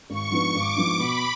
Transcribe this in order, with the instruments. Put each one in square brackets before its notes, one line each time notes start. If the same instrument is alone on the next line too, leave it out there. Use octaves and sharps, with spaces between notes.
[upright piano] G#1 [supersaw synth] C#6
[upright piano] G#2 F3 B3 D4
[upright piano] G#1 [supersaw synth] D6
[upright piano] G#2 F3 B3 D4
[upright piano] B2 [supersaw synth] B5